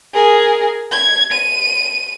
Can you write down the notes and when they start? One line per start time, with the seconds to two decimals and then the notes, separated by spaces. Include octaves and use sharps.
0.14 G#4 A#4
0.91 G#6
1.32 D#7